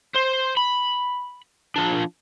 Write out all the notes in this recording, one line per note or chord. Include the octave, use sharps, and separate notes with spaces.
C5
B5
F3 D4